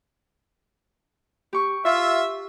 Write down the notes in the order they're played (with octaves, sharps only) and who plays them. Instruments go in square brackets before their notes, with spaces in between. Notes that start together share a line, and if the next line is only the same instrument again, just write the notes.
[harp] G4 C#6
[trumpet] F4 [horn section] E5